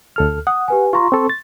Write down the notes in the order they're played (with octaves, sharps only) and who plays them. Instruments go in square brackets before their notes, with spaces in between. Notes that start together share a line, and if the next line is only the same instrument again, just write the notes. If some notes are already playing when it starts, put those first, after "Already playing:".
[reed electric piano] D2 A4 F6
[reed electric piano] F#5 [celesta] D#6
[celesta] G4 B4 G#5
[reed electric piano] F4 A#5 [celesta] C6 C#6
[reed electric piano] C4 A4
A6